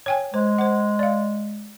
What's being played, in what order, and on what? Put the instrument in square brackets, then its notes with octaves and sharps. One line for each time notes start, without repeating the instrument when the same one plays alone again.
[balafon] C#5 G5 G#5
[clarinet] G#3 [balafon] C5
[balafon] C5 F#5
D5 F5